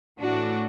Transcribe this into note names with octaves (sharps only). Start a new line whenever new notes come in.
A2 E3 A3 D4 F#4